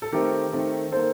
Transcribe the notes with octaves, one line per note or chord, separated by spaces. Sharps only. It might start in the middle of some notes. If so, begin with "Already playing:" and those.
A4
D#3 A3 C4 G4 A#4
D#3 A3 C4
D#3 A#3 A4 C5